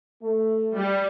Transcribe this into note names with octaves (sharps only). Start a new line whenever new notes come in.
A3
G3